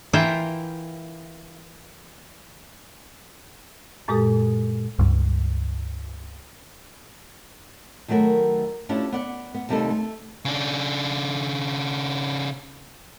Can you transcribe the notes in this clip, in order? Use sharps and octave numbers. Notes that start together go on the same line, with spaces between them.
E3 E4 F4 A#4 E5 G5
F#2 A#2 G#3 G4 A4 D#6
C#2 G2
D#3 F#3 A3 F#4 A#4 B4
A3 C#4 D4 E4 F4 G4
B3 D5 F#5
B3
D#2 C3 G3 A3 D#4 A4
A3
C#3 D4